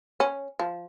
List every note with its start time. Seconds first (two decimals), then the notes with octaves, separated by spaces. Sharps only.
0.20 C#4
0.59 F3